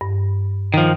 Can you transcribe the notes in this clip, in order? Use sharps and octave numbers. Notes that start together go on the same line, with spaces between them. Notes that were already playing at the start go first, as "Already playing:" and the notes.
G2
D#3 F3